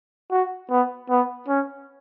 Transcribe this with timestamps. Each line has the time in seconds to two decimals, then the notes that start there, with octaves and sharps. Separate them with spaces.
0.31 F#4
0.70 B3
1.10 B3
1.48 C#4